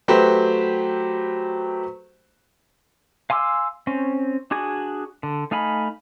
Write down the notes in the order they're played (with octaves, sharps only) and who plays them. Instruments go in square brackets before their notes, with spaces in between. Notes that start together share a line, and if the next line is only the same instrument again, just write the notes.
[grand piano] F#3 A3 G4 B4 C5
[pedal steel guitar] F5 G#5 C6 D6 E6
C4 C#4
D4 F#4 G#4 G#5
D3
A3 D#4 F5 G#5 B5